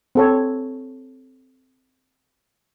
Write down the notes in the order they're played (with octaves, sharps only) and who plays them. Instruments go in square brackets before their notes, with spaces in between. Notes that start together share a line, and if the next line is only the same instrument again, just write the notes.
[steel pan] C4 A4 C#5